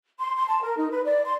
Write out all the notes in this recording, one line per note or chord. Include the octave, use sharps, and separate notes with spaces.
C6
C6
A5
A#4
D#4
B4
D5
C6